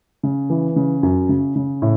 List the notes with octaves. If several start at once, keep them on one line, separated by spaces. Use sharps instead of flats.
C#3
E3
C#3
F#2
C#3
C#3
A2